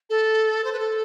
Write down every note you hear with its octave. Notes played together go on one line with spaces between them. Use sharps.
A4
C5
B4
A4